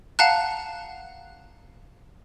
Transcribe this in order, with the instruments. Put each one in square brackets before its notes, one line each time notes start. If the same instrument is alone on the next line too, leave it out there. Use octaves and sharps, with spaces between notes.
[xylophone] F5 F#5 A5 A#5 F#6